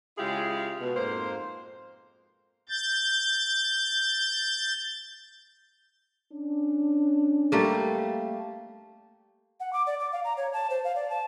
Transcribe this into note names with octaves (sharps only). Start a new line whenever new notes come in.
C#3 G#3 E4 F4 G4 G#4
B2
F2 G#2 A#3 C5
G6 A6
C#4 D4
G3 A3 A#3
F#5
D6
D5
D6
F5
A#5
C#5
A5
C5
F5
D5
A5